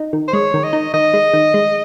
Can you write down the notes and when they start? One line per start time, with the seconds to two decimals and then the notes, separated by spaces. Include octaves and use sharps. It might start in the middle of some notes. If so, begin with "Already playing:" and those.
Already playing: D#4
0.13 D#3
0.28 C5
0.33 G#3 C#5
0.54 D#3
0.64 D#5
0.73 D#4
0.94 D#3 D#5
1.14 G#3
1.33 D#3
1.54 G#3